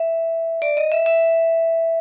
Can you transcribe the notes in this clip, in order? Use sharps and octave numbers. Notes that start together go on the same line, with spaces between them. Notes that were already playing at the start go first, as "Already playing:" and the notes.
Already playing: E5
D5
D#5
E5
E5